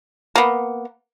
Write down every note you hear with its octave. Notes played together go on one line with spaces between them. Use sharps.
A#3 B3